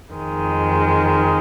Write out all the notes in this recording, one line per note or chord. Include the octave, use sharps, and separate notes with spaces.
F2 D#3 G#3